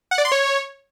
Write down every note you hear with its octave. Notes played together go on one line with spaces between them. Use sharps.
F#5
D5
C6
C#5